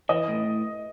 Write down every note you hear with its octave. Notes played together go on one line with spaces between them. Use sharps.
E3 D#5 D#6
A2